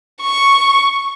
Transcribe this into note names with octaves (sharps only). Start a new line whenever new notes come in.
C#6